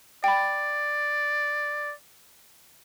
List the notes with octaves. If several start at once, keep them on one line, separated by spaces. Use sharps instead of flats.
D5 G5 B5